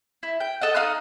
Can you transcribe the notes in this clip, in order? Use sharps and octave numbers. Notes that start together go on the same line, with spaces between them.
E4
G5
A4 D#5 F#5
D#4 F5 D#6 F#6